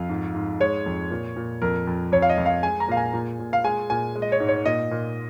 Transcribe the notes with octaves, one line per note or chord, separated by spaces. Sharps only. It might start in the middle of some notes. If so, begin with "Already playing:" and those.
Already playing: F2 F5
G#2
G#2
G#3 C#5
F2
A#2
A#2
F2 A#4
F2
F2 C#5
F5
D#5
F2
F5
G#3 G#5
A#5
A#2 F5
G#5
A#2
A#2
F5
G#3 G#5
A#2 G#5
G#3
D#5
C#5
G#2
C#5
A#2 D#5
A#2